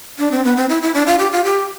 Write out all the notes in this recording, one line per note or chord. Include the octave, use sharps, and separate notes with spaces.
D4
C4
B3
C4
E4
E4
D4
F4
G4
F4
G4